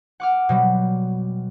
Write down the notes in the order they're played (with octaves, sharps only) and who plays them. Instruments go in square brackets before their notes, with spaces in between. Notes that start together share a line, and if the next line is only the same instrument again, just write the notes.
[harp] F#5 D6 F6
B2 F#3 G3